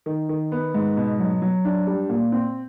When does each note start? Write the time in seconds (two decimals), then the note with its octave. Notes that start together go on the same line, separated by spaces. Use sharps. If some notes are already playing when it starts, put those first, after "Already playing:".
0.06 D#3
0.29 D#3
0.52 B3
0.74 G#2
0.97 B2
1.19 F#3
1.42 F#3
1.65 D4
1.87 G3
2.09 A#2
2.32 C4